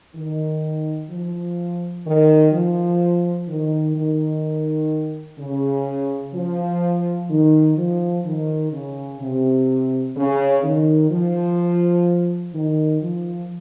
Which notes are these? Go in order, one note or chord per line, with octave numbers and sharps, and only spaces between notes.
D#3
F3
D#3
F3
D#3
D#3
C#3
F3
D#3
F3
D#3
C#3
C3
C#3
D#3
F3
D#3
F3